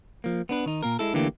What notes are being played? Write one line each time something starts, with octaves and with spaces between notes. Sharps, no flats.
F3 A#3
B3 D4 B4
D#3 D#4
A#2 A#3 A#4
G#3 E4 A4
D3 E3 A3 A#3 D4 G4